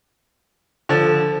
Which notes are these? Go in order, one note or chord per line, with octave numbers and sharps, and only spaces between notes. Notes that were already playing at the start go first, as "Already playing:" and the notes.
D3 F3